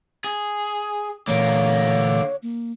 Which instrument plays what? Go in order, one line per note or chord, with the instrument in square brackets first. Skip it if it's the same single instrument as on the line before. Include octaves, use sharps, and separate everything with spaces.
[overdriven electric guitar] G#4
[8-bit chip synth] A#2 E3 A3 [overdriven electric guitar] D3 A#3 [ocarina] C#5
[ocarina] A#3